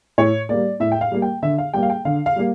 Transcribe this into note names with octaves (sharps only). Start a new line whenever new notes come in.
A2 C#5
G3 A#3 D5
A2 E5
G5
F5
G3 A#3
G5
D3 E5
F5
G3 A#3 G5
F5
G5
D3 F5
F5
G3 A#3